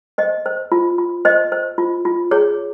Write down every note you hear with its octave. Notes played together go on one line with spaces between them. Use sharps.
C5 D#5
C5
F4
F4
C5 D#5
C5
F4
F4
G#4 C#5